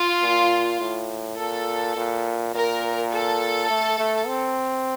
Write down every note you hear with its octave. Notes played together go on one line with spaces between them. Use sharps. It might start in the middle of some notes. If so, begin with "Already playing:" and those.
Already playing: F4
A#2
A2
A#2 A4
A#2
A#2 A#4
A4
A3
A3
C4